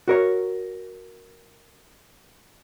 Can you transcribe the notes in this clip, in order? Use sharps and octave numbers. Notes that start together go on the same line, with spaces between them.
F#4 A#4 C#5